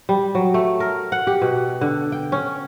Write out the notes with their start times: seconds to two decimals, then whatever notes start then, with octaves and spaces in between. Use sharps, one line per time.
0.09 G3
0.35 F#3
0.54 A3
0.80 A#4
1.12 F#5
1.27 G4
1.42 B2
1.81 D3
2.12 G5
2.32 C#4